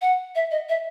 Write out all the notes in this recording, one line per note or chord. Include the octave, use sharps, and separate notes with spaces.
F#5
E5
D#5
E5